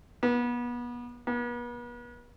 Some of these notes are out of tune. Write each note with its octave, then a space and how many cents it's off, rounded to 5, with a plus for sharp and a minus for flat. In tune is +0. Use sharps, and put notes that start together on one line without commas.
B3 -30
B3 -40